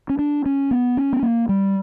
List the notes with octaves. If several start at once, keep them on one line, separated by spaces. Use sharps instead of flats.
C#4
D4
C#4
B3
C#4
B3
A#3
G3